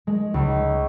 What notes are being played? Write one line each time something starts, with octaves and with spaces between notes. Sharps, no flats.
G#3
C#2